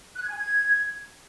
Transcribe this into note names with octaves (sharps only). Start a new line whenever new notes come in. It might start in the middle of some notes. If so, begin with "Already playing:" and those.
F#6
G#6
G#5
G#6